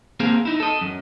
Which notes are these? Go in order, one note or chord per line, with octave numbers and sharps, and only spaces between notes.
A#3 C4 G#4 C5 F5
D#4 E4
A4 D#5
F#2